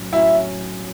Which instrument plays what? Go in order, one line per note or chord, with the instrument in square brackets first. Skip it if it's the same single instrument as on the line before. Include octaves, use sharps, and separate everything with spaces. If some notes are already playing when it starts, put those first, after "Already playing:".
Already playing: [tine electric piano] A2 F#3 C#4
[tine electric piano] A2 F#3 C#4 [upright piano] E4